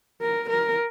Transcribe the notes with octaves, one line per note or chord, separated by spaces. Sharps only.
A#4
A#4